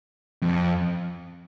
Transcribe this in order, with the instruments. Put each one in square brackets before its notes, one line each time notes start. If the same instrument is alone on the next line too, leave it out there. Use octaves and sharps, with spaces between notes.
[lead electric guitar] F2